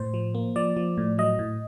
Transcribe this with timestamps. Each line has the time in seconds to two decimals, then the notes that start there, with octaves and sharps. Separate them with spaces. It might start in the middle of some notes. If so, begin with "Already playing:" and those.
Already playing: A2 C5
0.14 F3
0.35 A#3
0.56 F3 D5
0.77 F3
0.98 A2
1.18 F#3 D#5
1.39 A2